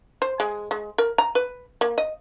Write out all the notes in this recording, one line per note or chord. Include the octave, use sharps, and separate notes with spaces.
C5
G#3
G#3
A#4
A#5
B4
A#3
D#5